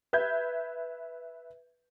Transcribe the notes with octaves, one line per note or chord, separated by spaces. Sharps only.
B4 E5 G6 G#6